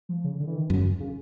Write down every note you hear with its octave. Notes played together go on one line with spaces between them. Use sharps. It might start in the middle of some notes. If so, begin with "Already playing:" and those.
F3
C#3
D3
E3
D#3
F#2 C#3
C#3